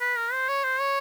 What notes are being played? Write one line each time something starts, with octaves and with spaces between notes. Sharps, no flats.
B4
A#4
C5
C#5
C5
C#5